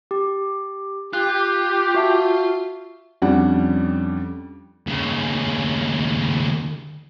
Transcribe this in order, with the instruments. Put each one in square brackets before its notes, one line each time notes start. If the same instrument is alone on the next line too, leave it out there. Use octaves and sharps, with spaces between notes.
[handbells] G4
[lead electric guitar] F4 [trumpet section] G4 [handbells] F#6
[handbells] F#4 E5 A5
[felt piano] F2 G3 C#4 D4 F#5
[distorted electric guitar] D#2 C#3